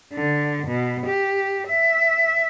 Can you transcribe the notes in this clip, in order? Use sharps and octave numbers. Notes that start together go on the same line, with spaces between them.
D3
B2
G4
E5